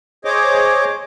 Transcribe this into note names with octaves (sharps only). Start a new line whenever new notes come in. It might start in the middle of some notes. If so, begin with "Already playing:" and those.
G#4 C5 C#5 D#5 D6